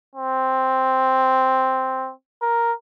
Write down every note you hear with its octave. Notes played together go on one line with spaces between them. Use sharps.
C4
A#4